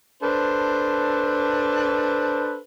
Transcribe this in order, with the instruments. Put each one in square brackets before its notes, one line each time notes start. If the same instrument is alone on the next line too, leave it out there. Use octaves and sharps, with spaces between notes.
[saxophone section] D4 A4 B4 C5